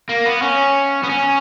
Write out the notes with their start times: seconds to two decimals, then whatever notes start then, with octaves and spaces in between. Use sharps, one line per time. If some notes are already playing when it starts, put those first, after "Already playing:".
0.09 A#3
0.26 B3
0.42 C#4
1.03 B3
1.10 C#4